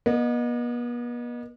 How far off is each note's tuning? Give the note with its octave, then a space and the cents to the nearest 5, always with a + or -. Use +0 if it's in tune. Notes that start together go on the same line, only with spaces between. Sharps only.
B3 -40 D#5 -20